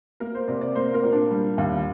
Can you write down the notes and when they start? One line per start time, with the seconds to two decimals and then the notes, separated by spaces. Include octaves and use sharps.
0.20 A#3 A#4
0.35 C5
0.48 C3 D5
0.61 D5
0.75 A#3 C5
0.94 A#4
1.03 A#2
1.12 D4
1.31 G3
1.58 D#2